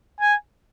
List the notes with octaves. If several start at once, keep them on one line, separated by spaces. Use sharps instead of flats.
G#5